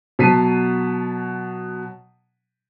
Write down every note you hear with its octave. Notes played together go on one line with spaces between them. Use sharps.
B2 F#3 A5 B6 C7 D#7